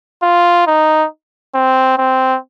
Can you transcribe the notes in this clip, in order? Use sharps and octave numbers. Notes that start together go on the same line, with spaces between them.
F4
D#4
C4
C4